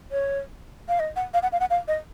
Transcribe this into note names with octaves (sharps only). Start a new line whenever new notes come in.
C#5
F5
D#5
F#5
F5
F#5
F5
F#5
F5
D#5